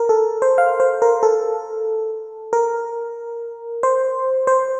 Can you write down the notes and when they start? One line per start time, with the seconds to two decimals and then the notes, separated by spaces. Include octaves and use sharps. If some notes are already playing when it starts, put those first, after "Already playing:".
Already playing: A#4
0.09 A4
0.42 C5
0.58 F5
0.80 C5
1.02 A#4
1.23 A4
2.53 A#4
3.83 C5
4.47 C5